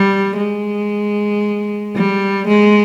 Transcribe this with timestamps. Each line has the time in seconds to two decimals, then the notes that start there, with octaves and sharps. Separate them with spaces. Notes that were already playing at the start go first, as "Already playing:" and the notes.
Already playing: G3
0.37 G#3
1.95 G3
2.48 G#3